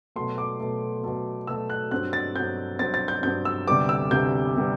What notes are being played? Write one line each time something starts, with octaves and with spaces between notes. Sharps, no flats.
B2 F#3 A3 C6
D6
B2 F#3 A3
B2 F#3 A3
B2 F#3 A3 E6
F#6
G2 F#3 C4 F#6
A6
G2 F#3 C4 G6
G2 F#3 C4 A6
A6
G6
G2 F#3 C4 G6
E6
D2 C3 G3 B3 D6
E6
D2 C3 G3 B3 G6
C3 G3 B3